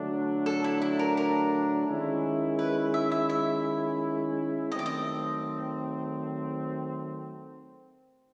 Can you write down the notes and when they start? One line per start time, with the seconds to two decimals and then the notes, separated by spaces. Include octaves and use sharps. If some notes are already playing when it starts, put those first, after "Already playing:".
Already playing: D3 F#3 A3 D4
0.46 A4
0.64 E4
0.82 E4
0.99 A#4
1.17 A#4
1.88 D#3 G#3 C#4 E4
2.59 B4
2.94 E5
3.12 E5
3.29 E5
4.71 D#3 F#3 A3 C4 D#5
4.79 D5
4.86 D#5